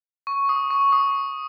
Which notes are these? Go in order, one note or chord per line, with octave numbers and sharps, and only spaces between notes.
C#6
D#6
C#6
D#6